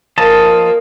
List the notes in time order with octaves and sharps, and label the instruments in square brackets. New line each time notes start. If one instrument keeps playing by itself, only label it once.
[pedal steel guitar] F3 D#5 A5 [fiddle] A#3